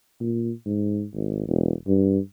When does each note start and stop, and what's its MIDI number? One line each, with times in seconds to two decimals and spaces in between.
0.20 0.51 46
0.66 1.05 44
1.14 1.47 32
1.48 1.73 28
1.87 2.18 43